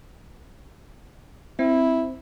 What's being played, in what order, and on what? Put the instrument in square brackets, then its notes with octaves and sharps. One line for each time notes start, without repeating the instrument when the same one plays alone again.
[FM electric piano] C4 [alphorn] E4